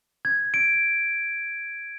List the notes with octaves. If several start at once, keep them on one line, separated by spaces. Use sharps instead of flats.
G#6
D7